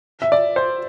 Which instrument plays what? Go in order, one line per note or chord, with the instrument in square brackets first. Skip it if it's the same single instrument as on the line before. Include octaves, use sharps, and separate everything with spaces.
[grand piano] E5
D5
C5